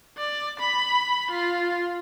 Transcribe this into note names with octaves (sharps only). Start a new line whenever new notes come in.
D5
B5
F4